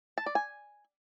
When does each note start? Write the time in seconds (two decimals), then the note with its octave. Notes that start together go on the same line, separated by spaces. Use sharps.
0.18 A5
0.26 D5
0.35 G#5